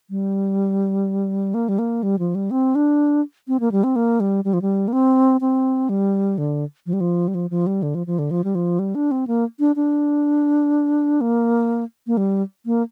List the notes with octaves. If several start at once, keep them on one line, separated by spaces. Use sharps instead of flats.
G3
A#3
G3
A#3
G3
F3
G3
C4
D4
C4
A#3
G3
C4
A#3
G3
G3
F3
G3
A#3
C4
C4
G3
D3
F3
G3
F3
G3
F3
F3
G3
D3
F3
F3
D3
F3
G3
F3
G3
D4
C4
A#3
D4
D4
A#3
A#3
G3
A#3